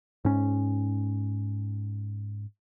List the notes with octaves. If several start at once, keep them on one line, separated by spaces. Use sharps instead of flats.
G#2 C#4